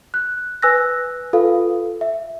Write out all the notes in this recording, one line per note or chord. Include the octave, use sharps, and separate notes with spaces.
F#6
B4 G#5 E6 F#6 A#6
F4 A4 B4 F5
E5